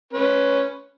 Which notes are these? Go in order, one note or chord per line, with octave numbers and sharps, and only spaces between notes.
C#4 B4